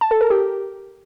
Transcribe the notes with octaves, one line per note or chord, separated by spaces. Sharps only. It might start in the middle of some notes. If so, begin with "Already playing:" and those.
A5
A4
A#4
G4